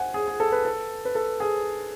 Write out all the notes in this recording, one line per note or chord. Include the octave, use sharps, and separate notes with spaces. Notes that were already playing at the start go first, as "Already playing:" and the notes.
Already playing: F#5 G#5
G#4
G#4
A4
B4
A4
B4
A4
G#4